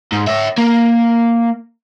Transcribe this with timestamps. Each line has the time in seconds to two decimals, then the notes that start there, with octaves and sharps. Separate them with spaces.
0.12 G#2
0.27 C#5 E5
0.58 A#3